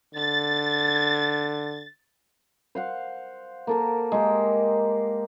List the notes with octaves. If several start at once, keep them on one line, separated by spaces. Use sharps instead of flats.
D3 A6
C5 F5 F#5
A#3 A4 A#4
G#3 G4